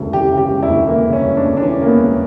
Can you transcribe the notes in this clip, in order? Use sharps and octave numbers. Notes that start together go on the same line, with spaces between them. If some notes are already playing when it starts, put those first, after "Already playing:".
Already playing: E1 D2 C#3 E3
E3 G4
C#3
G4
E1
E4
D2
E3 A#3
C#3
C#4
E1
D4
D2
D4
E3 C#4
C#3 A#3
B3
E1